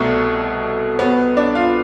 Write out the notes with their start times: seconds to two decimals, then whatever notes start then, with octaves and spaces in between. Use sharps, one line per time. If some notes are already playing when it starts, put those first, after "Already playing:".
Already playing: C2 B2 A3 A4
0.99 B3 B4
1.37 D4 D5
1.55 F4 F5